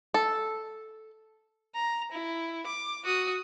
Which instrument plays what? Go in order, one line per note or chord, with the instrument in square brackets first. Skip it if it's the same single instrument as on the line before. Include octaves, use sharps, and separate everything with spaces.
[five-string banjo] A4
[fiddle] A#5
E4
D6
F#4 D#6